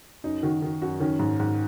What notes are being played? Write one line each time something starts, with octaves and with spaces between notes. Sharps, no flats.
F#2 D#4
D#3 F#4
D#3
F#2 F#4
D#3 C#4
G#2
G#2